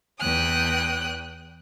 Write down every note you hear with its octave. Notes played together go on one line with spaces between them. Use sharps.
E2 G5 D#6 F#6